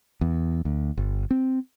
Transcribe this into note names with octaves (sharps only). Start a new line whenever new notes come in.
E2
D2
G1
C4